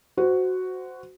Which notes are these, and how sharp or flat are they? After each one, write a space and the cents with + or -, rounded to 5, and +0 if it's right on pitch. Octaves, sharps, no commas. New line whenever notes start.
F#4 +0 C5 -20